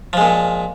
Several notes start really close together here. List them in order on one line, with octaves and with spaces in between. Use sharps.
F3 G#3 A#2